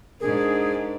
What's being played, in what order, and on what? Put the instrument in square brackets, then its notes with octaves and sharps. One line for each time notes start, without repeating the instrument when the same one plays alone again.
[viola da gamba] G#2 D4 [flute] G#4 [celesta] A#4